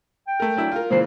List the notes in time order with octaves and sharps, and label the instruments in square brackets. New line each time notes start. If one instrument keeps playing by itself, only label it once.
[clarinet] G5
[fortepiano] A3 A#4
F#3 D4 E4
F4 A#4
[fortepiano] A#2 C#3 E3 [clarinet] C5